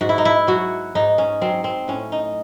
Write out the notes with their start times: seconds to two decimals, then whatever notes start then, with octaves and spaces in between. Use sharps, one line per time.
0.01 G#2 F#4
0.09 E4
0.18 D#4
0.25 E4
0.47 F#3 F#4
0.95 G#2 D#4
1.18 C#4
1.41 F#3 C4
1.64 C4
1.88 A2 C#4
2.12 D#4